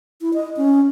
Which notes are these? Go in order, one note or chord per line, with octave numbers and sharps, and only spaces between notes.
E4
D#5
C#4